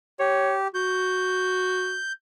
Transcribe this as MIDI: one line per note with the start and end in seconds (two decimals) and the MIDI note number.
0.20 0.67 67
0.20 0.55 73
0.75 1.98 66
0.75 2.12 91